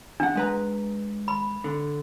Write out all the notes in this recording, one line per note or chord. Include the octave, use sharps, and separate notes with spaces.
E2 D4 F#5
G#3 B4 A#5
B5
D3